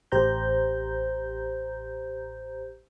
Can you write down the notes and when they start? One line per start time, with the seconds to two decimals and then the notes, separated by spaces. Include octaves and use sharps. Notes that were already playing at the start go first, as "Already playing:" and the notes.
0.12 A1 G4 C5 A#5 G6